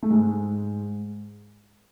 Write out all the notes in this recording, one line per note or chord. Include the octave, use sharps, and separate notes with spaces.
A3
G#2 G#3